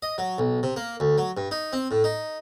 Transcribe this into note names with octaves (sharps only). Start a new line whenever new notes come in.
D#5
F#3
B1
C3
A#3
D2
F#3
G2
D#4
C4
A2
D#4